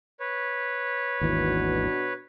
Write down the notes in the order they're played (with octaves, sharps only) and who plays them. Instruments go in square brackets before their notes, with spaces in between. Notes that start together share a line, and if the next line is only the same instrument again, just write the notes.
[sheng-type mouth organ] B4 C#5
[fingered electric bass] G#1 D#2 E3 [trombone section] B2 D4 F#4